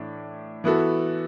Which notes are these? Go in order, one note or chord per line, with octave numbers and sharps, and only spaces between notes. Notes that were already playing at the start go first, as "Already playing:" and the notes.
Already playing: A2 E3 D4
E3 B3 F#4 A4